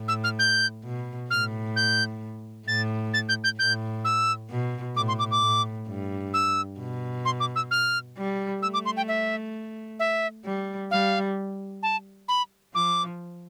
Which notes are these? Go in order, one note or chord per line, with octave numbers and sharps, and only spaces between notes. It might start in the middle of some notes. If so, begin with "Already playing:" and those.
Already playing: A2
E6
F6
G6
B2
A2 F6
G6
A2 A6
A6
G6
G6
A2 G6
E6
B2
A2 D6
C6
D6
D6
A2
G2
E6
B2
C6
D6
E6
F6
G3
A3 E6
D6
C6
G5
E5
E5
G3
G3 F5
A5
B5
F3 D6